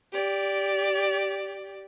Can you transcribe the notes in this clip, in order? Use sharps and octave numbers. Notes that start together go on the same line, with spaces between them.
G4 D5